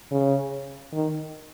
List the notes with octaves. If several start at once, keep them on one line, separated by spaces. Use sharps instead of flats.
C#3
D#3